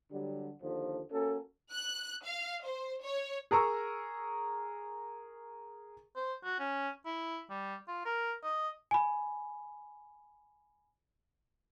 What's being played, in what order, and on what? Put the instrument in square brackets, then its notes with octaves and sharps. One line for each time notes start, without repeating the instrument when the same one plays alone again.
[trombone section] D3 F#3 G3
D#2 D3 F3
A#3 C#4 F#4 A4
[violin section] F#6
F5
C5
C#5
[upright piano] G#4 A#4 A#5 C#6 E6
[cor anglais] C5
F#4
C#4
E4
G3
F4
A#4
D#5
[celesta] G#5 B5